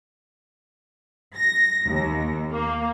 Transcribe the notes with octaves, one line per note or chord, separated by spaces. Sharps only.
A#6
D#2
A#3